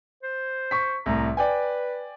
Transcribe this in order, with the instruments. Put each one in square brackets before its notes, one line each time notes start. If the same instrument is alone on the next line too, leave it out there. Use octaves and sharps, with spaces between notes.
[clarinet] C5
[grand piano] C#6 B6
[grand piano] C2 A2 [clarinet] A#5
[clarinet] B4 [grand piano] D5 G5 G#5